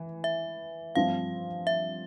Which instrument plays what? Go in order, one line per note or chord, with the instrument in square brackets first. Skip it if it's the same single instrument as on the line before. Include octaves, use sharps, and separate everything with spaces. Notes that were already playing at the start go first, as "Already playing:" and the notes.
Already playing: [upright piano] E3
[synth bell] E5
[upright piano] G2 F3 C4 F4 [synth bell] F5
[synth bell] E5